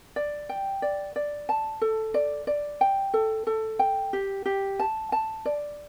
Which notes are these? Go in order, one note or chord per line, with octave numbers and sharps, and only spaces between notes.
D5
G5
D5
D5
A5
A4
D5
D5
G5
A4
A4
G5
G4
G4
A5
A5
D5